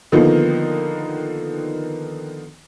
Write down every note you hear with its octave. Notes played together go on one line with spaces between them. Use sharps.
D3 D#3 F3 A#3 B3 D#4